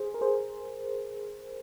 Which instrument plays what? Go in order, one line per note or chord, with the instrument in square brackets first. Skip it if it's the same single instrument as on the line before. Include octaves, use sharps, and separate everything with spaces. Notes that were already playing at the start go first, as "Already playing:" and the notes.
Already playing: [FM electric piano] G#4 C5
A#4
G#4 C5